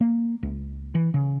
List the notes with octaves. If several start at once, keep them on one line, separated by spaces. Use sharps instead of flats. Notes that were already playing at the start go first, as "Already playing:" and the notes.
A#3
C#2
E3
C#3